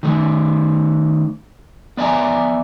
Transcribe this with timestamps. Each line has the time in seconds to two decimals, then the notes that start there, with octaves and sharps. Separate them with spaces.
0.03 D#3 A3
1.97 B3 D5 E5 G#5 A#5